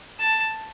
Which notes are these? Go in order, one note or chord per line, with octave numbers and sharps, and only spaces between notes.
A5